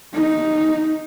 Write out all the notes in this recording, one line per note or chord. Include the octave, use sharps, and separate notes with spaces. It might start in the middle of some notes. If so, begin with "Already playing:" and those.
D#4